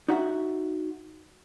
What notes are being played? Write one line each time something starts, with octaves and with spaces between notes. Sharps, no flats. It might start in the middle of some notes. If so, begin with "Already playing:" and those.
D#4 F#4 E5 F#5